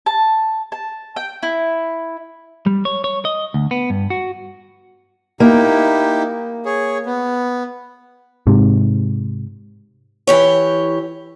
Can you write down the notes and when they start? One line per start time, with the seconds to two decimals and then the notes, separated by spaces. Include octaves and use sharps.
0.06 A5
0.72 A5
1.16 G5
1.43 E4
2.66 G3
2.85 C#5
3.04 C#5
3.25 D#5
3.54 D2
3.71 B3
3.90 G2
4.10 F#4
5.40 A#3 D#4 E4 G4
6.65 G#4 C#5
7.06 B3
8.47 G#2 C3
10.27 E3 G4 C#5